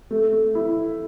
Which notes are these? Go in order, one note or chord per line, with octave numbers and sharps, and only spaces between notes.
A3
A3
E4